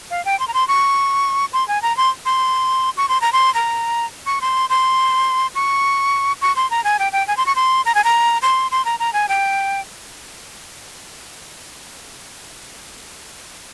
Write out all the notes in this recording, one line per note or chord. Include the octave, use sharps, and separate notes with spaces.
F5
G5
C6
A#5
C6
C#6
C6
G#5
A#5
C6
C6
C#6
C6
A#5
C6
A#5
C#6
C6
C6
C#6
C#6
C6
A#5
G#5
G5
G5
G#5
C6
C#6
C6
A#5
G#5
A#5
C6
C6
A#5
A#5
G#5
G5